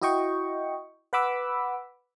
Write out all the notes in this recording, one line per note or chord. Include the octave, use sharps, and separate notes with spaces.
E4 F#4 D#5 G5 C#6
B4 F#5 B5 D6 E6